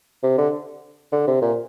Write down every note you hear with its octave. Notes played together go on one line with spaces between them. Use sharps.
C3
D3
D3
C3
A#2